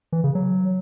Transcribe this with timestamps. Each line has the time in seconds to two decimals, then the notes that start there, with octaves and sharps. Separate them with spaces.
0.12 E3
0.24 C#3
0.35 F#3